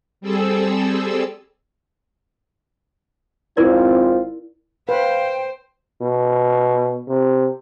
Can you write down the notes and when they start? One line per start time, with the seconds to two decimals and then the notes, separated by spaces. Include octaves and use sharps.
0.21 G3 C4 G#4 A4 E6
3.57 G#1 C4 E4 F4 A#4 D5
4.89 B4 C5 F5 G5
6.01 B2
7.08 C3